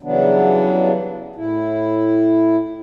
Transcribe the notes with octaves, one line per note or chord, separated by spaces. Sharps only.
C#3 E3 F#3 G3 B3 D4
A2 E4